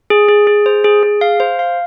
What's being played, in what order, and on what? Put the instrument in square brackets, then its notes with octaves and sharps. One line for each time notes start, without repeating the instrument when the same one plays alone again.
[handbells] G#4
G#4
G#4
C5
G#4
G#4
F5
C5
F5